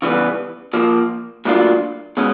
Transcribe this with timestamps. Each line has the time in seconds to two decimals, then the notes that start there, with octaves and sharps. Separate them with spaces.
0.02 C#3 E3 G3 B3
0.73 A#2 F3 A#3
1.45 A2 F#3 A#3 D4 F4
2.17 B2 G#3 C#4